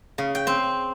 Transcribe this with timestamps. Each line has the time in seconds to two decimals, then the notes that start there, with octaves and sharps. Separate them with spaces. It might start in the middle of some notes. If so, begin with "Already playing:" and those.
0.18 C#3
0.35 G5
0.47 C4